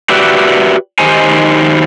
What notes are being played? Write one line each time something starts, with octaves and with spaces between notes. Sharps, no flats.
F#4 G4 B4 D5 E5
D#3 D#4 G4 C5 G#5